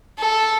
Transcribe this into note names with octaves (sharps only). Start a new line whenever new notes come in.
A4